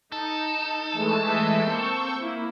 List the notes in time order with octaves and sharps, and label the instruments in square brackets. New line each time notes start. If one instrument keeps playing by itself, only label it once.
[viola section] D#4 [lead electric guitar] A4
[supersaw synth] E3 G#3 A3
[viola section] D#5 E5
[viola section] A#3 C4 [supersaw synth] C#6 E6 G6
[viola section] A#3 E4